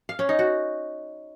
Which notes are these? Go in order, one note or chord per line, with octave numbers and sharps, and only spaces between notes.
F5
C#4
D#4
F#4